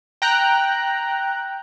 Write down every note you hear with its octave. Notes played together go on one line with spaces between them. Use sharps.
G5 A#5 F#6